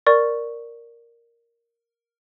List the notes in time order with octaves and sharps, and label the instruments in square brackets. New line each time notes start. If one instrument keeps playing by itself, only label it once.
[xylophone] A#4 D5 C#6